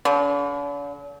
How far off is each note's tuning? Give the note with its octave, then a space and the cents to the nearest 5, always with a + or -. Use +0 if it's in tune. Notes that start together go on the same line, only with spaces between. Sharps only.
D3 -45